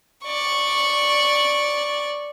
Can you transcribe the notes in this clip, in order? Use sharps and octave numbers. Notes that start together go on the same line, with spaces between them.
D5 C#6